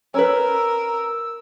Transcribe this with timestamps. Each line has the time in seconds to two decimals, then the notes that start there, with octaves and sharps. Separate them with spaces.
0.14 C#4 A#4 B4 E6